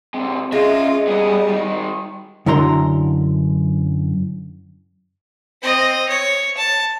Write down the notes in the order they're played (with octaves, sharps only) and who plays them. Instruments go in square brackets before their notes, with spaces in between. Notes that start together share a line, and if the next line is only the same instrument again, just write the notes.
[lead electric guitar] C3 G#3 [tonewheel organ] C4
[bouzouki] G#3 [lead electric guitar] C#4 E5 [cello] F4 [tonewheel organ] D#5
[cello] G3 [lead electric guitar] B3 G#4
[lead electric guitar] G#2 D#3
[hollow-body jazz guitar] F#2 D3 E4 A#5 C6
[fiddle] C4 D#5
C#5
A5